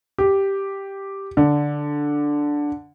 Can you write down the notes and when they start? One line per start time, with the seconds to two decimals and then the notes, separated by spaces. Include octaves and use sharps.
0.18 G4
1.37 D3